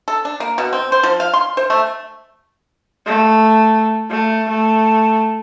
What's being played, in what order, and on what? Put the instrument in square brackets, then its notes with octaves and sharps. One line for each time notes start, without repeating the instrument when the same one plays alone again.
[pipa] A4
D4
A#3
B2
C4
C5
F3
F5
C6
C5
A3
[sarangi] A3
A3
A3